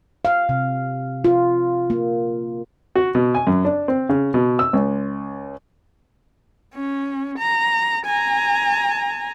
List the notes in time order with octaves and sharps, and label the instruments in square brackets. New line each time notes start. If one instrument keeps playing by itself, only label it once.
[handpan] F5
C3
F4
A#3
[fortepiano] F#4
B2
G#5
F#2
D4
C4
C#3
B2
E6
C#2
[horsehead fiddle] C#4
A#5
G#5 A#5